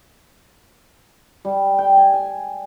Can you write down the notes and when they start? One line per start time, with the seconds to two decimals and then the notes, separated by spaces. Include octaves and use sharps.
1.45 G3
1.79 G5
1.97 G#5
2.13 G#5